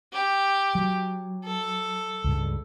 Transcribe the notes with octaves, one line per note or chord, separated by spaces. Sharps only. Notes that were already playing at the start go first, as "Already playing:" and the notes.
G4
F#3
A4
C#2 G2